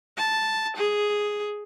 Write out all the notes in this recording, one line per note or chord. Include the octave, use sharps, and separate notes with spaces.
A5
G#4